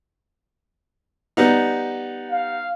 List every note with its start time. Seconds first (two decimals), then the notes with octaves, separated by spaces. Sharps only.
1.37 G3 B3 D#4
2.32 F5